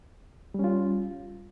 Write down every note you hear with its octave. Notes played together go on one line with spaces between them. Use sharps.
G3 C#4 F4